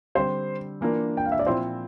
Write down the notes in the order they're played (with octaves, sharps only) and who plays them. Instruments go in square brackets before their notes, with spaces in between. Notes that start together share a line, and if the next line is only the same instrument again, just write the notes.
[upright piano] D3 G3 C4 [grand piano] C5
[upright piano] E3 A#3 D4 F4 A#4
[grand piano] G5
F5
E5
D5
[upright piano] A#2 F3 C4 E4 [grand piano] C5